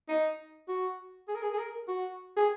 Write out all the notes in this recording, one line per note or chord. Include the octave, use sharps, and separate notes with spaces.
D#4
F#4
G#4
A#4
G#4
G#4
A#4
F#4
G#4